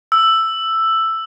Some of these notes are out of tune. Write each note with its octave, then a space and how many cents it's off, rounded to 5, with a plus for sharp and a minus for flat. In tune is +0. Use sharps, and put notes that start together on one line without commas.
E6 +5